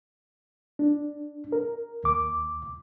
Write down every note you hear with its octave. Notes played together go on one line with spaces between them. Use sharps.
D4
A#4
D#2 D6